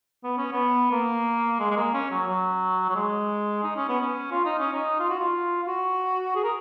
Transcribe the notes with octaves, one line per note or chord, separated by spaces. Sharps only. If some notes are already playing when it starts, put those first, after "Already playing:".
B3
C#4
B3
A#3
G#3
G#3
A#3
C#4
F#3
F#3
F#3
G#3
D#4
C#4
B3
C#4
F4
D#4
C#4
D#4
F4
F#4
F4
F4
F#4
G#4
A#4